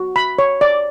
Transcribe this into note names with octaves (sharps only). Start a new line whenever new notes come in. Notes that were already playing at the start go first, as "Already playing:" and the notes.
Already playing: F#4
B5
C#5
D5